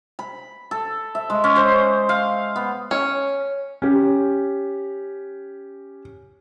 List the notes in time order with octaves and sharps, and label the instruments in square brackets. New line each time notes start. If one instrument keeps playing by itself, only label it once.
[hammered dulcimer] B5
A4
E5
G#3
C#4
C5
F5
B3
[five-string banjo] C#4
[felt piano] C#4 G4